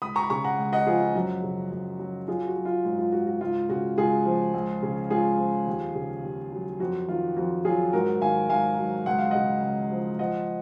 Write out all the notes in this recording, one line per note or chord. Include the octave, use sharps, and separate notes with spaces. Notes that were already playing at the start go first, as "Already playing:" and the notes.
C#2 B5 D#6
A#5 C#6
B5
C#3 A#5 C#6
F#5 A#5
C#2
D#5 F#5
F3 F4 G#4
F4
F#2 F#4
C#3
F#2
F#3
F#3 F4 G#4
F#4
F#3
F4
G#2
F4
G#2 F#4
F#4
C#2 F4
C#3 F#4
C#2 F4 G#4
F3
C#2
C#3
C#2 F4 G#4
F3
D#2
C#3
D#2
F#3
F2 F#4
D#3 F4
F2 F#4
F#3 F4 G#4
G#2 F#4 A#4
D#3 F5 G#5
G#2 F5 G#5
F#3
C#2 F#5
F5
C#3 D#5 F#5
C#2
F3
F3 D#5 F#5